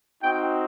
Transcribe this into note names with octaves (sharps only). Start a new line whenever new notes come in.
C4 D#4 F#4 G5